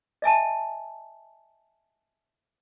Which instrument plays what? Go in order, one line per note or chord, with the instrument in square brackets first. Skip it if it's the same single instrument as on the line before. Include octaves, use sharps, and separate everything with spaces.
[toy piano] D#5 E5 G#5 A5